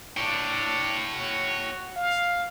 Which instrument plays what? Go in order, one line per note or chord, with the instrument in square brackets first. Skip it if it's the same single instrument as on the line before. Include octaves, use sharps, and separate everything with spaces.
[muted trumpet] D4 [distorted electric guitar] C#5 G5
[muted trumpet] F#4
F5